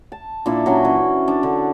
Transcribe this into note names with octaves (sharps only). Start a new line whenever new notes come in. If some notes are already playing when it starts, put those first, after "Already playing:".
A5
A#2 D4 E4
F#3 C#4 F#4
E3 C#4
D4
D3